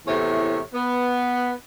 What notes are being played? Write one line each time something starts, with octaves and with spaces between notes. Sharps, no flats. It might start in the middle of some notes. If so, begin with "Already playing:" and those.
E2 A2 C3 C#5
B3